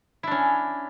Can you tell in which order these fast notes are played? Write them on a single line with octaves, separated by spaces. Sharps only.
E4 D4 C#4